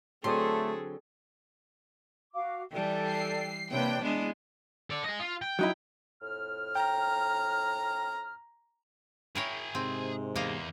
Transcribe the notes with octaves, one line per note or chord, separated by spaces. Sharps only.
D3 F#3 A3 C4 G#4 A4 C6
F#4 F5 D6
E3 G3 A4 D5 G5
C7
C3 A#3 D4 B4 C#5 G5
G#3 B3 D4 E4
A4 D5
G#4 D#5
F4
G5
F#3 D#4 E4
F2 A2 F6
G5 A#5
E4 G#4 A#4 C#5 G5
G#2 C3 C4
E2 A#3 D#5 F5